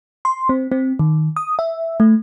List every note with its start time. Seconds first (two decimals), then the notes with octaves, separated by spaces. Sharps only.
0.25 C6
0.49 C4
0.72 C4
0.99 D#3
1.36 D#6
1.59 E5
2.00 A3